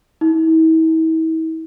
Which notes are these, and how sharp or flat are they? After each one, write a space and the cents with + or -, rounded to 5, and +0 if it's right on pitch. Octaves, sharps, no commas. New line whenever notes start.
E4 -40